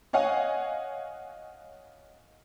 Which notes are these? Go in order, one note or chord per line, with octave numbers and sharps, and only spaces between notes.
C#5 D#5 F5 F#5 G#5